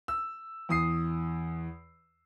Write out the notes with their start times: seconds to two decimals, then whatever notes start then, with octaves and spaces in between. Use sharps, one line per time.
0.08 E6
0.69 E2 D#6 C7